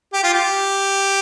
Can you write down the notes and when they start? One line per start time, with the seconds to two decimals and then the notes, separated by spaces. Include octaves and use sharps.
0.13 G4
0.24 F4
0.34 G4